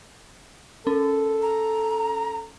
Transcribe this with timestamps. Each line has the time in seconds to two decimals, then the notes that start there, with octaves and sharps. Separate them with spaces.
0.87 C#4 A4
1.42 A#5